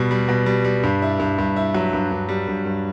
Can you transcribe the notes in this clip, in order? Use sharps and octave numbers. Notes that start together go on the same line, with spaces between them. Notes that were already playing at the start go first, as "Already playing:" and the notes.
Already playing: B2 G3
G3
B2
G3
G3
G2
E4
G2
G2
E4
F#3
G2
G2
G3
G2
G2